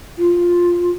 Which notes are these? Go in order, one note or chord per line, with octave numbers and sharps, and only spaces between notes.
F4